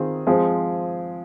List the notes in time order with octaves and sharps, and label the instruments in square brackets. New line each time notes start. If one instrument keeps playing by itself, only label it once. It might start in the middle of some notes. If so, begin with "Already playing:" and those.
Already playing: [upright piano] D#3 C4 F4 G#4
F3 G#3 C4 G#4